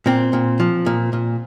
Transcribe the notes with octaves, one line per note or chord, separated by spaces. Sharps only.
A#2 C4
A#2
F3
A#2
A#2